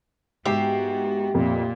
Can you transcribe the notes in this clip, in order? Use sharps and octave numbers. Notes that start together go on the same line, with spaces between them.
G#2 B3 F#4 G4 E5 G5 C7
F2 A#2 A#3